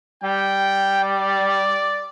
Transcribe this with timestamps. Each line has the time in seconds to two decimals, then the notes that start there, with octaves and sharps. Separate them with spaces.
0.23 G3 G5
1.04 D5